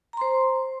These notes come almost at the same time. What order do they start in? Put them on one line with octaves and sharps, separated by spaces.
A#5 C6 C5